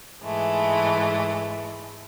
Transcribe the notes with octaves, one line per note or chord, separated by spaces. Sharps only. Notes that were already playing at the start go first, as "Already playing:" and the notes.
G#2 E3 G#3 A3